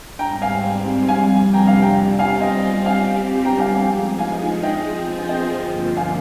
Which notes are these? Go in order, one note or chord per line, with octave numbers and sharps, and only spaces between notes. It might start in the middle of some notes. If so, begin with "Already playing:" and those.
G#2 G3 C4 G5 A#5
F5 G#5
F2 C3 G3 F5 G#5
G5 A#5
F5 G#5
G5 A#5
G3 C4 F4
F5 G#5
D#5 G5
G3 C4 G4 F5 G#5
G5 A#5
F5 G#5
F3 G#3 D#4 G#4 F5 G#5
F5 G#5
F3 C4 F4 G#4 C5 D#5 G5
G5
G#5
D#5 G5
G2 D3 F3 A#3
F5 G#5